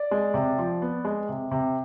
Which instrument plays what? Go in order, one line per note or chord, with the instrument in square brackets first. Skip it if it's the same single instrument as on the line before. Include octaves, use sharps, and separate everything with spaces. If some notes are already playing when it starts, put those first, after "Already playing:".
Already playing: [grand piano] D5
G#3
C3
F3
B3
G#3
C3
C3